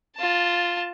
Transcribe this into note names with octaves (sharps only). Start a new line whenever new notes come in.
F4 A5